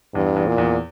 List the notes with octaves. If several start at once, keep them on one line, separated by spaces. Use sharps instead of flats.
E2 G2
E2
A#2
E2